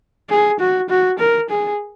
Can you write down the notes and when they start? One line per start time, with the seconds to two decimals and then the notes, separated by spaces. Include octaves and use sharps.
0.30 G#4
0.60 F#4
0.90 F#4
1.19 A#4
1.50 G#4